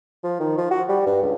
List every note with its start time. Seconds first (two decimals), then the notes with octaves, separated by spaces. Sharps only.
0.24 F3
0.39 D#3
0.58 F3
0.71 F#4
0.89 G3
1.06 G2
1.22 C#2